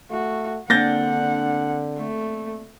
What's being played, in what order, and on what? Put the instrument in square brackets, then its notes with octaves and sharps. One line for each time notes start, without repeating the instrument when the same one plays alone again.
[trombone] A3 [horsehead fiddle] F#4
[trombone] D3 [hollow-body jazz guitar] A#3 C4 D4 [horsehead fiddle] F#5 [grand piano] G6 A6 A#6
[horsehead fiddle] A3